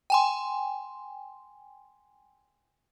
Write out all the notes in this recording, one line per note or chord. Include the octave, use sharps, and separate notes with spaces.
G5 G#5 C6